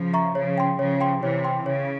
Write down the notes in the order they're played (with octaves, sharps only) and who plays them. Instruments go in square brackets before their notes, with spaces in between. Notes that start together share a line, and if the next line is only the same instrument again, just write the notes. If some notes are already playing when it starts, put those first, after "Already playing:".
Already playing: [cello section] C#3 F3
[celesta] E5 A#5 C#6
[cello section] C#3 F3 [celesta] C#5
[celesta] G5 C6
[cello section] C#3 F3 [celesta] C#5
[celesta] G5 C6
[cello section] C3 E3 [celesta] C#5
[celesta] G5 C6
[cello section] C#3 [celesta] C#5